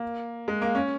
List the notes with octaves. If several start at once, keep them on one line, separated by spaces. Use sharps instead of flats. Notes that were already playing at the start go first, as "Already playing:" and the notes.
Already playing: A#3
G#3
A#3
C#4